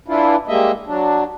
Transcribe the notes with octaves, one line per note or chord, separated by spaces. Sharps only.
E3 D4 E4 F4
G3 G#3 A#3 D#5 E5
F#3 D4